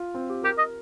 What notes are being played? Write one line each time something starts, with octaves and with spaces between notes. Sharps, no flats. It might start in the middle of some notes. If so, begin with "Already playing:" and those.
Already playing: F4
C4
G4
G4 A#4
D#5